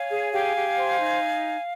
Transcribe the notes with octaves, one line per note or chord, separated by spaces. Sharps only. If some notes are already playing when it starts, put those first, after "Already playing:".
Already playing: C#5 F5 G#5
G#4
G4 F5 G#5
G4
C5
D#4